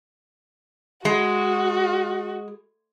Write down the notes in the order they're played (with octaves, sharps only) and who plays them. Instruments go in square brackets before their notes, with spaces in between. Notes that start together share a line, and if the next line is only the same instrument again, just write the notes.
[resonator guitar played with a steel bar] G#3 [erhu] F#4